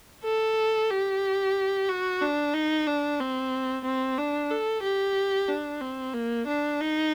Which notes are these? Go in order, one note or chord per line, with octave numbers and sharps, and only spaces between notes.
A4
G4
F#4
D4
D#4
D4
C4
C4
D4
A4
G4
D4
C4
A#3
D4
D#4